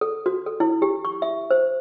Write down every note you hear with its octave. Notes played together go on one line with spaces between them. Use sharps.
A4
F#4
A4
E4
G4
C#6
E5
C5